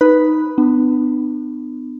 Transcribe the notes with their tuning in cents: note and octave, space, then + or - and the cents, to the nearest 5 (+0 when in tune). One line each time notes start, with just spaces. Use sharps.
D#4 +0 B4 +0 B5 +0
B3 +30 D4 +45